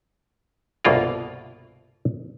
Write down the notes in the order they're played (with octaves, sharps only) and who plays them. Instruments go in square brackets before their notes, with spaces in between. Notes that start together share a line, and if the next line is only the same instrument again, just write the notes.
[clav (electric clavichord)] G1 C2 B2 A#3 F4 A#4